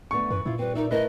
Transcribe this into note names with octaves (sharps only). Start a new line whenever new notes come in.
D3 A3 B3 C#6
F#2 E3 B4
A#2 E4 F4
G3 C4 B4
D#4 A#4 D5 E5
A3 E4 A#4 B4 D#5